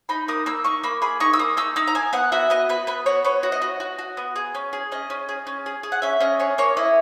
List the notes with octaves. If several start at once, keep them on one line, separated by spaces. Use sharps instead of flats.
D#4 B5
A#3 D#6
A#3 E6
D#4 C#6
A#3 B5
G#4 B5
D#4 C#6
E6
A#3 D#6
D#4 E6
D#4 E6
A#5
A#3 G#5
B3 F#5
F#4 E5
B3 D#5
B3 B4
B3 B4
F#4 C#5
B3 C#5
F#4
D#5
F#4
F#4
F#4
B3
G#4
C#4
G#4
C#4 D#5
C#4
G#4
C#4
G#4
G#4
F#5
C#4 E5
C#4 D#5
G#4 C#5
A#3 C#5
E4 D#5